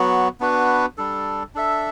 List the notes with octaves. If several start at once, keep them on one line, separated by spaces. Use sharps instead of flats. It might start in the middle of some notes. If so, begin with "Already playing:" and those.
Already playing: F#3 B3 F#4
B3 D4 F#4 B4
G3 D4 A4
D4 A4 E5